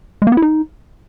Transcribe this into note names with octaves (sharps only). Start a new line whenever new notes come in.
G#3
A#3
B3
E4
D#4